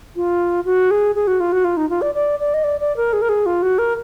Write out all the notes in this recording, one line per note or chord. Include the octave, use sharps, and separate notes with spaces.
F4
F#4
G#4
G#4
F#4
F4
F#4
F4
D#4
F4
D5
D5
D5
D#5
D5
D5
A#4
G#4
A#4
G#4
F4
F#4
A#4